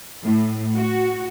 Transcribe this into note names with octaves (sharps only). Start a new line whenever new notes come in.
A2
F#4